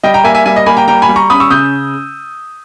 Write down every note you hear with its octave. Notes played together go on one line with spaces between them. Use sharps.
G3 D#5 G5
G5 A#5
A#3 E5 G#5
E5 G#5
G3 E5 G#5
D#5
A#3 G#5 B5
G5 A#5
G3 G5 A#5
G#5 B5
G3
A#5 C#6
C#4 B5 D#6
C#6 E6
C#3 D#6 G6